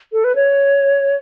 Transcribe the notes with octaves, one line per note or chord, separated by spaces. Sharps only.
A4
B4
C#5